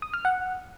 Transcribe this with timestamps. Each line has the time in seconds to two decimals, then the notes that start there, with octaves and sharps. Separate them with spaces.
0.02 D#6
0.14 F6
0.25 F#5